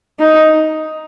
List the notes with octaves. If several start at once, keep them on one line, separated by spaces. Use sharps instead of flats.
D#4